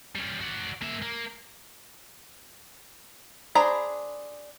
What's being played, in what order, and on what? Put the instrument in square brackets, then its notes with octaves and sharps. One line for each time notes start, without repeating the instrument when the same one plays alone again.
[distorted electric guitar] G3 C#4
F#4 D5
A#3 E5
A#3
[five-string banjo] D4 G#4 C5 A#5 B5